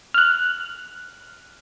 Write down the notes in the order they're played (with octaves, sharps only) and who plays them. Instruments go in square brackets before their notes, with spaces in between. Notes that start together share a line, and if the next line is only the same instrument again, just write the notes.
[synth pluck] F6 F#6